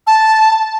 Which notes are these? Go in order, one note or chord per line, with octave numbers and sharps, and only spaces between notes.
A5